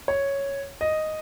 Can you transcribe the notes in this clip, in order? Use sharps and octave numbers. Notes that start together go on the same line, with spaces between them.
C#5
D#5